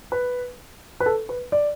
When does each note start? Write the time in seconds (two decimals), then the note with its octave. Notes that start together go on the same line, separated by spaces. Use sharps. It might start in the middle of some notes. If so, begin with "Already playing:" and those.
0.12 B4
1.00 B4
1.06 A4
1.29 B4
1.52 D5